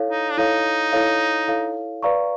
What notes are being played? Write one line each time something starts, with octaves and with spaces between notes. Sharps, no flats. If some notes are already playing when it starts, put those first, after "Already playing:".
Already playing: E4 A4 C#5 F5
D#4
D4
D#4 E4 A4 C#5 F5
E4 A4 C#5 F5
E4 A4 C#5 F5
B4 D5 F5 A#5 C#6